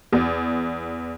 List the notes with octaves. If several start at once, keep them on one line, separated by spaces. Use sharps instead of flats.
E2